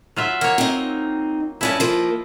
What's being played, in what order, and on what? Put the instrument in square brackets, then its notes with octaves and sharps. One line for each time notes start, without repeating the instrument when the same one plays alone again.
[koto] F#3 F4 E5
[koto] A#3 C#5 [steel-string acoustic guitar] F#5
[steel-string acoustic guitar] C4 D#4
[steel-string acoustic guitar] G2 C#4 A5 [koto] E4 D5 D#5
[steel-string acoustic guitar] F3 A#3